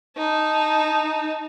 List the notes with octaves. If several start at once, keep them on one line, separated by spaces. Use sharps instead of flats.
D#4 A5